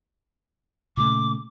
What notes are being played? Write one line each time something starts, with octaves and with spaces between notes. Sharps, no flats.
A#2 C#3 A3 D6